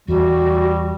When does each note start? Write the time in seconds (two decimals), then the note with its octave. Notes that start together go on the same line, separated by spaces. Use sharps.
0.08 E2 G3 F#4